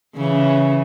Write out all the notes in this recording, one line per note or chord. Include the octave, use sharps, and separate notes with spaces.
C#3 E3